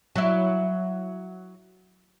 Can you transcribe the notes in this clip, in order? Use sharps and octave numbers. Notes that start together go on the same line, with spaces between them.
F#3 E4